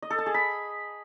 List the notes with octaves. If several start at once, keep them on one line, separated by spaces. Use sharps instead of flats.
D#5
A4
A5
G#4
B5